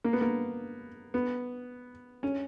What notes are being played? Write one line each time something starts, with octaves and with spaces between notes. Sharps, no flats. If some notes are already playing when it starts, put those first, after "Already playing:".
A#3
B3
A#3
B3
C#4